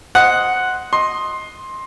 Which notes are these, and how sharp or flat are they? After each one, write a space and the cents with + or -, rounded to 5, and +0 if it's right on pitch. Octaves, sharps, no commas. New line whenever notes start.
C5 +0 D#5 +5 F#5 +0
D#5 +0 C6 +15